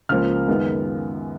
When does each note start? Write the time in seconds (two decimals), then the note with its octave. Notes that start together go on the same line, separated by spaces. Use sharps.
0.09 C#2 C#3 F3 A#3 F6
0.48 F#2 D#3 G#3 B3